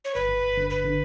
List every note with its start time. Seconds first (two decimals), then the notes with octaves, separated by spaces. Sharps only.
0.05 C#5
0.15 G1 B4
0.29 G1
0.42 G1
0.57 D3
0.70 G1 B4
0.85 D3